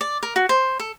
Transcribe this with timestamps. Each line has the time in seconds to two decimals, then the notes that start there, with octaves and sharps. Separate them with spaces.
0.01 D5
0.23 A#4
0.36 F#4
0.49 C5
0.80 A4